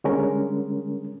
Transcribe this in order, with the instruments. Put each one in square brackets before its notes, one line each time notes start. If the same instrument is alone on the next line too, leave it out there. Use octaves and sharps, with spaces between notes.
[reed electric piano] D3 G3 G#3 C#4 A#4